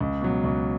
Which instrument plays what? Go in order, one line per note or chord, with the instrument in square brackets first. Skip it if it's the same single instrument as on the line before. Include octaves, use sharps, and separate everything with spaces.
[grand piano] C#2
B2 F#3
C#2